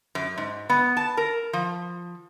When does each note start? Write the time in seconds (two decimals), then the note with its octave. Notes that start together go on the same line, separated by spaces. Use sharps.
0.15 F#2
0.37 G#2
0.70 B3
0.97 A5
1.17 A#4
1.53 F3